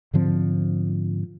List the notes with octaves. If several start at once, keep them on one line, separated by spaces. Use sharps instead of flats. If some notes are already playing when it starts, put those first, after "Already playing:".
G#2 D3 F3 C4